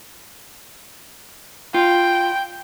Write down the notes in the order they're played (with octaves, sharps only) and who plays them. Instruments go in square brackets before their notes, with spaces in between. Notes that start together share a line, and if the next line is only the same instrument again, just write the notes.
[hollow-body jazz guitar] F4 [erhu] G5